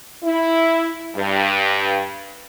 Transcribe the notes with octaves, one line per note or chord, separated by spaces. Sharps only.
E4
G2